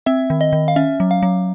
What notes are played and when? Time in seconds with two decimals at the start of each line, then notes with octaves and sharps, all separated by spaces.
0.06 C4 E5
0.30 D#3
0.41 D#5
0.53 D#3
0.68 F5
0.76 C#4 E5
1.00 F#3
1.11 F5
1.23 F#3